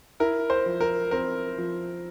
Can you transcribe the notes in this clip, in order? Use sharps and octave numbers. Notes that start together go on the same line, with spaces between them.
E4 A#4
C5
F3
A#4
C4 A#4
F3